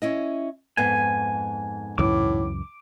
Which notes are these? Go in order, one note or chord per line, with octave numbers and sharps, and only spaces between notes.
C#4 E4 D#5
F2 G#2 B3 G#5
C#2 F#2 A2 E3 D6